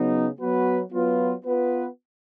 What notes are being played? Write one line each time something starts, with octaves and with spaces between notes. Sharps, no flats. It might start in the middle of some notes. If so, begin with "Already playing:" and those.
Already playing: C#3 F#3 B3 D#4
F#3 B3 F#4 B4
F#3 B3 F4 B4
B3 F4 B4